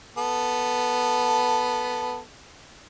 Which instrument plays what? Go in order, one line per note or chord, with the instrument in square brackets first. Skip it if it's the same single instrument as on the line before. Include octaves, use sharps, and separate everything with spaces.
[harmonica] B3 A4